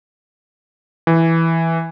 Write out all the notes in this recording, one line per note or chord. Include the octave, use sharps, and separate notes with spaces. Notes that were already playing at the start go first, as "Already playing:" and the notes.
E3